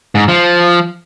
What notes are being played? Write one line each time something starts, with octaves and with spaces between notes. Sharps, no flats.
G#2
F3